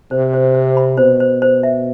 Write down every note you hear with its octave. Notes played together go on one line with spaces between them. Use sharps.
C3 C5
C5
C5
B5
B2 C5
C5
C5
E5